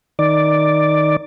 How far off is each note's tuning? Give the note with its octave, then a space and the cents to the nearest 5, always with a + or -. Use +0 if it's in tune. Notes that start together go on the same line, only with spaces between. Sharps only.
D#3 +0 D5 +0